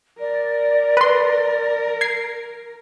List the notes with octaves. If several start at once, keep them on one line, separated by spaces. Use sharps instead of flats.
A#4 D5
B4 C6
G#6 C7